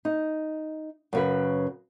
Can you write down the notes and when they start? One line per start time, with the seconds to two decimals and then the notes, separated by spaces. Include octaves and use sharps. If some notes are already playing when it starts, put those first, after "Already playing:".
0.05 D#4
1.13 F#2 C#3 B4